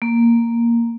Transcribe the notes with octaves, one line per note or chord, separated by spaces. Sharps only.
A#3